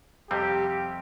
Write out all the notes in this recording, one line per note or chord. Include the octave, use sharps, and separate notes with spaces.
F2 C3 G3 C4 G4